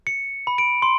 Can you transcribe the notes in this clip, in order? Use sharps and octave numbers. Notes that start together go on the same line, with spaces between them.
C#7
B5
D7
C6